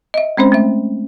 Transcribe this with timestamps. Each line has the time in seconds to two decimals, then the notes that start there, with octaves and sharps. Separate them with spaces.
0.14 D#5 E5
0.37 G#3 C4 C#4 C5
0.52 A3 E5